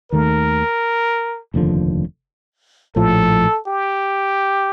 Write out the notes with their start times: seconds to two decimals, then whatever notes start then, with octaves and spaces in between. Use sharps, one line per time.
0.12 D#2 D#3 A3 A#4
1.54 F1 D#2 D3 F3
2.96 A#1 A2 F3 A4
3.67 G4